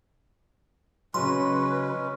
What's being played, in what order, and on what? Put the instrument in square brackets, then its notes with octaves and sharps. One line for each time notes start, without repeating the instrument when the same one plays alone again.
[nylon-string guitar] C#3 F#3 [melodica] G#3 C#4 [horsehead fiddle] B4 [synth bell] C6